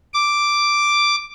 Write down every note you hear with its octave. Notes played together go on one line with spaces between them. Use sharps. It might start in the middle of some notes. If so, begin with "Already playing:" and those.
D6